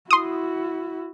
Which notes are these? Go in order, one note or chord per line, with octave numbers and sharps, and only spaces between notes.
E4 F#4 C6 D#6